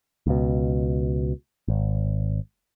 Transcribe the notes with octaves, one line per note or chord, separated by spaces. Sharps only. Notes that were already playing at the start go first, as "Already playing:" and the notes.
C#2 B2
G#1